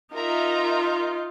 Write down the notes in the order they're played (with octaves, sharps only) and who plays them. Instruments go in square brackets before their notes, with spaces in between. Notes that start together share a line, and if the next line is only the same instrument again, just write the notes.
[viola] D#4 F4 [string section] A#4 E5 A#5